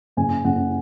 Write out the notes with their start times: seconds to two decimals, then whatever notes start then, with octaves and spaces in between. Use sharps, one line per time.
0.17 F#1 G#5
0.44 F#1 F#5